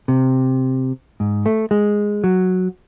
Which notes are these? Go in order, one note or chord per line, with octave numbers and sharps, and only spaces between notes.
C3
G#2
A3
G#3
F#3